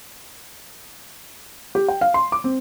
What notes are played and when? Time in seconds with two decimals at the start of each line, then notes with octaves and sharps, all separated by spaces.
1.75 G4
1.88 G5
2.01 F5
2.14 C6
2.32 D6
2.44 C4